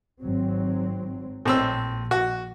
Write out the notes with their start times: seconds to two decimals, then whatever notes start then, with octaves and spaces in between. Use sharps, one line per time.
0.21 G#1 F#3 C4
1.45 A#1 A2 C4 E6
2.11 F#4